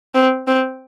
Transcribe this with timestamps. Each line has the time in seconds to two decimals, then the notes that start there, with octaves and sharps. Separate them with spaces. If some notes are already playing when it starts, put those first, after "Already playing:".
0.15 C4
0.48 C4